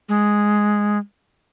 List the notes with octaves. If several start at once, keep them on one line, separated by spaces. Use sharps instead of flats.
G#3